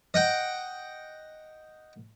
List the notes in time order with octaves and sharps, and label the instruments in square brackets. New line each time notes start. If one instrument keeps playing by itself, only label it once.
[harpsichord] D#5 F#5 G5